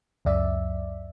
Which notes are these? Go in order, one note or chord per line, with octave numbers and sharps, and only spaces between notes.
C#2 F#2 D5 E5